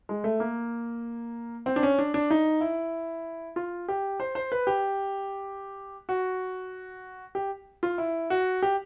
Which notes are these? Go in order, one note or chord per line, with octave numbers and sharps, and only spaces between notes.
G#3
A3
A#3
C4
D4
C#4
D4
D4
D#4
E4
F4
G4
C5
C5
B4
G4
F#4
G4
F4
E4
F#4
G4